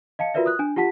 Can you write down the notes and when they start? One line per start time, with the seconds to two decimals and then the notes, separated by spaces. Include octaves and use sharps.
0.19 D#5 F5 A5 C#7
0.34 F4 F#4 A#4 B4 D5 E5
0.46 D#6 F#6
0.59 D4 G#5
0.76 F4 G4 F#5 A5 B6